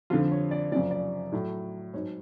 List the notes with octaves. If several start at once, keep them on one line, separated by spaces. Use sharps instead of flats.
F2 D3 F3 F4
C#5
D5
F#2 C#3 F3 D5
D5
A2 F#3
G#2 F#3 C#5